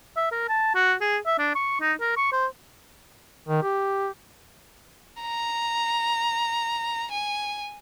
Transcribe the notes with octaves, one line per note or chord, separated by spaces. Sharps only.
E5
A#4
A5
F#4
G#4
E5
D4
C#6
D#4
A#4
C#6
C5
D#3
G4
A#5
G#5